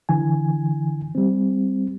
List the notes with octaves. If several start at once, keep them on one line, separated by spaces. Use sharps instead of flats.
D3 E3 G#5
G3 C4